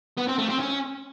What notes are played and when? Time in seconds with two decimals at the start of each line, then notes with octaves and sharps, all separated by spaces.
0.17 B3
0.28 C4
0.38 A3
0.49 C4
0.60 C#4